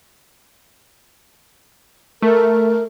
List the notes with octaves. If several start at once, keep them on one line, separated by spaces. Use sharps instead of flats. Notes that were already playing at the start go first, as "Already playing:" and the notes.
A3 A#4